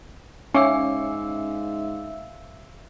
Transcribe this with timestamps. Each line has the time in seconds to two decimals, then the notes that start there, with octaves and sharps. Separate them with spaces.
0.54 G#2 C#4 E5 F5 G#5 D6 E6